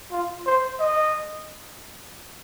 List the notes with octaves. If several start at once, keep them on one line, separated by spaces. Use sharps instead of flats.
F4
C5
D#5